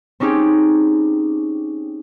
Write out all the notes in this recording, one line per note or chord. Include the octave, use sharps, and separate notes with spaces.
C4 C#4 D#4 G4 G#4